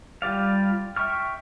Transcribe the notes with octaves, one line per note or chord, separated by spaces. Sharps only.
G3 F4 G4 D5 F5
E5 G5 C#6 F6